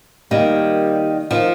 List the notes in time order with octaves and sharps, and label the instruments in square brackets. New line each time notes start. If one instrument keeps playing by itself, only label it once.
[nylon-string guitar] D#3 A#3 [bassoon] G3
[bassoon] D#3 [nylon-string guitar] F3